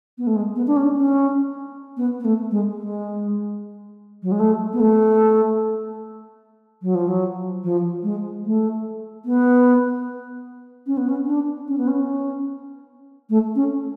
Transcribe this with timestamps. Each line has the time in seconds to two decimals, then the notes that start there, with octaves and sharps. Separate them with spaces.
0.18 B3
0.27 A3
0.36 G#3
0.56 B3
0.67 D4
0.76 C#4
0.96 C#4
1.97 B3
2.20 B3
2.25 A3
2.51 G#3
2.78 G#3
4.23 F#3
4.32 G#3
4.40 A3
4.73 B3
4.80 A3
6.82 F#3
6.95 F3
7.08 F#3
7.63 F3
8.03 G#3
8.44 A3
9.25 B3
10.87 C#4
10.97 B3
11.09 C#4
11.26 D4
11.68 C#4
11.78 B3
11.88 C#4
13.30 A3
13.55 C#4